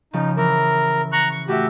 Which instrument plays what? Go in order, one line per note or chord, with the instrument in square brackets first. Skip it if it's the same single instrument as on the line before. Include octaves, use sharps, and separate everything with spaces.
[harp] C#3 F3 [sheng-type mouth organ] D#4
[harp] E3 [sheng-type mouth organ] A#4
[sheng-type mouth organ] A#5 C#6 F#6
C#6
[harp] A2 E4 E5 [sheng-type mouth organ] F#4 G4